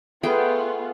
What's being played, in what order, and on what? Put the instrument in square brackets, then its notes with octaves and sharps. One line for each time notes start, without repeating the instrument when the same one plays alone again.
[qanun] A3 G#4 G5 [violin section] B3 F4